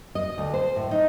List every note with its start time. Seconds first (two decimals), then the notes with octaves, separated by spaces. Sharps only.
0.15 D#5
0.38 D2
0.54 C5
0.76 A2
0.91 D#4